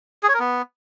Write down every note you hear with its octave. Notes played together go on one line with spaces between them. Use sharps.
G#4
C#5
A#4
B3